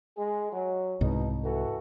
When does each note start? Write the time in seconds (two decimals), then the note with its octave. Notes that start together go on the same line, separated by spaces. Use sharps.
0.18 G#3 G#4
0.52 F#3
1.01 C2 G#2 B2 D#4
1.45 E3 F#4 A4